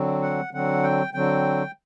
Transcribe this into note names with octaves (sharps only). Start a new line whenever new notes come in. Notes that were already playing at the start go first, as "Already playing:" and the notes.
Already playing: D3 F#3 C4
F#5
D3 F#3 C4 F#5
G5
D3 F#3 C4 G5